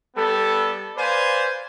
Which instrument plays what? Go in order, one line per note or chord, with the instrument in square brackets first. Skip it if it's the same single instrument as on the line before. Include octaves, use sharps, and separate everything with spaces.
[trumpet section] G3 B3 A4
B4 C5 D5 F5 G#5